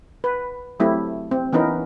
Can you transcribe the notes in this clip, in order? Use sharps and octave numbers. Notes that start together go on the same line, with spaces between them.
B4
F#3 A3 C4 E4 G4
C4
E3 B3 C#4 D#4 A#4 B4